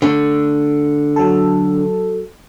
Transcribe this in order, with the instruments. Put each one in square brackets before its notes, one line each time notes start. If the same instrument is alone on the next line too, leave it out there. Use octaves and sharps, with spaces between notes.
[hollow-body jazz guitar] D3 A3
[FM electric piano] F#3 A4